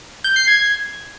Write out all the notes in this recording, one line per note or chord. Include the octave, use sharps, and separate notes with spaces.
G6
C7
G#6